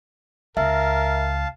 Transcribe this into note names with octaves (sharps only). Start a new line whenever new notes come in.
C#2 A#4 E5 F5 A5